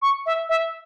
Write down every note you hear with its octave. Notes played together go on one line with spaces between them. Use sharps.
C#6
E5
E5